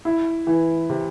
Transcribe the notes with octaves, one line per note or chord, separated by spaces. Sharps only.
E4
E3
C3